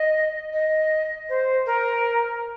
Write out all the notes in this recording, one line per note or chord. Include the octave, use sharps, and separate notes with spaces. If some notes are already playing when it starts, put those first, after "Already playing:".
Already playing: D#5
D#5
C5
A#4